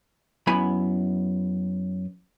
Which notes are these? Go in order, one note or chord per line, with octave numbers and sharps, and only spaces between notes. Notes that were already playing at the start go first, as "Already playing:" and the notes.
F#2 B3 E4 G#5 B5